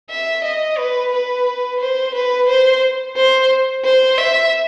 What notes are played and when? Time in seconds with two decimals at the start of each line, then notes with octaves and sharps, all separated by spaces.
0.10 E5
0.44 D#5
0.78 B4
1.12 B4
1.80 C5
2.14 B4
2.48 C5
3.16 C5
3.84 C5
4.17 E5